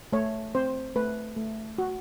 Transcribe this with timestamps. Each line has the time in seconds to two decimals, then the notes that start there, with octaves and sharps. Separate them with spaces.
0.12 A3 C#5
0.55 C4 C5
0.96 A3 B4
1.37 A3
1.78 F#4